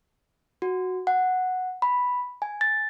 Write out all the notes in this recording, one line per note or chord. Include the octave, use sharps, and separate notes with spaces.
F#4
F#5
B5
G#5
A6